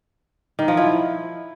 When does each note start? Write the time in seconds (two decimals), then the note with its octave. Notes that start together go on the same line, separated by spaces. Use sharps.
0.59 D#3
0.68 F3
0.77 E4